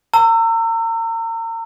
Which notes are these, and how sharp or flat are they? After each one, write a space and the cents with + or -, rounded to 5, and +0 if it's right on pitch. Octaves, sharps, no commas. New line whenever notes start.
A#5 -35 E6 +15